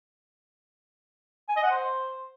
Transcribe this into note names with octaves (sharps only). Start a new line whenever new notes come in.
G#5
D#5
F#5
C5